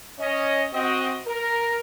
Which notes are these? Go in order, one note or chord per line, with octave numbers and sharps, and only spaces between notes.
C#4 D#5
C4 F#4 D#5
A#4